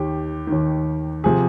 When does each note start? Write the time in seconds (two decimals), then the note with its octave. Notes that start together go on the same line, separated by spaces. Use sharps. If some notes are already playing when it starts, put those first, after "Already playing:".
Already playing: D#2 D#3 G4
0.47 D#2 D#3
1.24 C3 F3 G#4